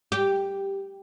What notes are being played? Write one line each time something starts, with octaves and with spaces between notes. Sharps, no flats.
G4